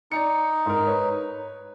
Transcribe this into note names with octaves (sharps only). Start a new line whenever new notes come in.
D#4 D5 A#5 C#7
G#2 A#4
B4 C#5